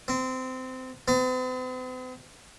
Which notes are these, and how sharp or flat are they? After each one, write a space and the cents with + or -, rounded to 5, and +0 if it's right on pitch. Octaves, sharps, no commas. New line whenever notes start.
C4 -20
C4 -45